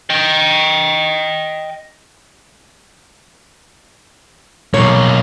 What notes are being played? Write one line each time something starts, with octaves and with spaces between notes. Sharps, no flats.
D#5 G5
B1 A#3 C#5